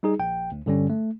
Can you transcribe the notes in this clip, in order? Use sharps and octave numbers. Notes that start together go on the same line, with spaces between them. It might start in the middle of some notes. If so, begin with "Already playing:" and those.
G3 D#4 G#4
A#1 G5
D2
G2 D3 G3 C#4
A3